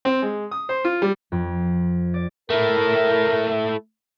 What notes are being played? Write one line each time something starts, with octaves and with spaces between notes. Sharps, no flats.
C4
G#3
D#6
C5
F4
G3
F2
D5
A3 E4 A#4